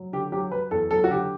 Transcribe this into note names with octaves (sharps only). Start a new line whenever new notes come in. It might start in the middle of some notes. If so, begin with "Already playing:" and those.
Already playing: F#3
D3 G4
F#3 G4
F#3 B4
E2 A4
F#3 A4
F#4
D3 G4